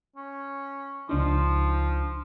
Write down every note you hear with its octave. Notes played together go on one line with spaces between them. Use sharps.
C#4
C#2 F3 D4 D#4